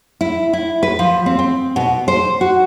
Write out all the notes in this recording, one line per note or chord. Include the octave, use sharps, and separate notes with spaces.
E4
E4
B4
F3
C4
C4
B2
C5
F#4